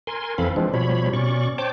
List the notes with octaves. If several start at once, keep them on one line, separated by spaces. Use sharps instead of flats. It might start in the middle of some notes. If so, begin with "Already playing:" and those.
A#4 G#5 C6
F2 E3 C4 A4 F5 B5
E3 F3 G#3 C4 D4
B2 F3 G3 C#5 B5
B2 C#4 D5 C#6
C5 C#5 G5 A5 D6